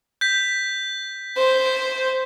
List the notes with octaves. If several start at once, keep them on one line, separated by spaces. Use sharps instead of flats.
G6 B6
C5